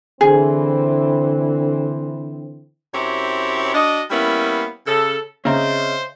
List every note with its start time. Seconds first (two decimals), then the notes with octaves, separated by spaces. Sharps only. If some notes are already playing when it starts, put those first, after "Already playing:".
0.21 D3 E3 C4 G#4
2.94 F#2 C4 E4 G4 C#5
3.75 D4 F#4 D#5
4.10 G3 A#3 B3 C#4 E4
4.87 C#3 A4
5.45 C#3 C4 G#4 C5 C#5 D#5 E5 A#5